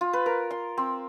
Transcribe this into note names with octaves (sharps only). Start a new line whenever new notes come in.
F4
B4
A#4
C6
C4